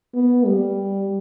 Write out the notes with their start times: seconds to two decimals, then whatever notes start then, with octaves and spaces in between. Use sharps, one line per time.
0.15 B3
0.45 G3